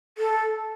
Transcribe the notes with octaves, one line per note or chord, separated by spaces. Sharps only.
A4